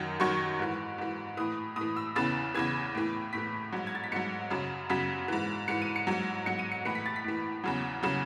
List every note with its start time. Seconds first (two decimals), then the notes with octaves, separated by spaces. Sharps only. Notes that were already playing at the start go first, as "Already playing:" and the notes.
Already playing: F#2 D#3 F#3
0.20 F#2 D#3 F#3 C#6
0.59 G#2 E3
0.98 G#2 E3
1.37 A2 E3 D#6
1.76 A2 E3 D#6
1.96 E6
2.16 E2 C#3 E3 A6
2.54 E2 C#3 E3 G#6
2.95 A2 E3
3.33 A2 E3 B6
3.72 G#2 F#3
3.87 G#6
3.95 A6
4.04 B6
4.12 G#2 F#3 C#7
4.50 F#2 C#3 F#3
4.90 F#2 C#3 F#3 B6
5.28 G#2 E3
5.68 G#2 E3 C#7
5.82 D#7
5.96 C#7
6.07 G#2 F#3
6.46 G#2 F#3 C#7
6.59 D#7
6.72 C#7
6.85 A2 E3 C#7
6.95 B6
7.06 A6
7.16 B6
7.24 A2 E3
7.64 E2 C#3 F#3
8.03 C#3 F#3